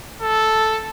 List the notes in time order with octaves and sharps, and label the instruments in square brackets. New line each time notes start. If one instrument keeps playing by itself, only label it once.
[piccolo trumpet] A4